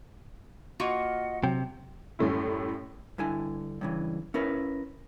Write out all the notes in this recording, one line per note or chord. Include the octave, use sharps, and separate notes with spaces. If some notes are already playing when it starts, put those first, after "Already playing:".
A#3 F4 F#4 D#5 F#5
C3 F#3 G5
F#2 A2 G3 A3 C#4 E4
G2 D3 E4 G#5
G2 C#3 E3
C#4 E4 A#4 B4